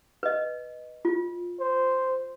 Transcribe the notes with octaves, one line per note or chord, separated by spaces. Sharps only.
B4 D#5
F4
C5